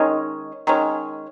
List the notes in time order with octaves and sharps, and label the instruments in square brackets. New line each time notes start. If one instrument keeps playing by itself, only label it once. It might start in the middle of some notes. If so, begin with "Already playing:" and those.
Already playing: [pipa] D#3 G#3 C#4
D#3 G#3 C#4